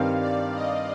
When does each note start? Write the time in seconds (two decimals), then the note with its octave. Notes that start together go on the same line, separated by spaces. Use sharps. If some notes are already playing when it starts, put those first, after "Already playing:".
Already playing: G2 D#3 G3 C4 F5
0.20 D5
0.55 D#5